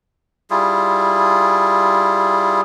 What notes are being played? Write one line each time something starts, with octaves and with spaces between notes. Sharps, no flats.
G3 E4 F4 G#4